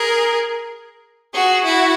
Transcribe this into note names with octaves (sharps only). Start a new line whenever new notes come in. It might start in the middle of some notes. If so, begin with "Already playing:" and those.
Already playing: G#4 A#4
F#4 G#4
E4 F#4